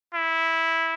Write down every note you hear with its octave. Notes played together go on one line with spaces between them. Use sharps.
E4